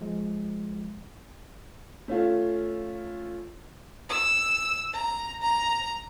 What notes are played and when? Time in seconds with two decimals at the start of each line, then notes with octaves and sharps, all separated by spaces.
0.01 F3 G#3
2.08 A3 C#4 F4 A4
4.10 E6
4.93 A#5
5.42 A#5